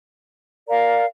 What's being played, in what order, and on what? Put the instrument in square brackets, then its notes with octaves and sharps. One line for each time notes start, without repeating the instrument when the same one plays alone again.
[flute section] A#4 D5 F5 A#5